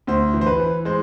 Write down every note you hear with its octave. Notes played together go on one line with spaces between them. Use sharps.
D2 C5
E3
C5
B4
E3
G#3 C5